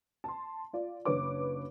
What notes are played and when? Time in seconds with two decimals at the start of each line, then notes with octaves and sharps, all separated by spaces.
0.24 A5 C6
0.73 F4 D5
1.05 F#1 D4 B4 C#5 D6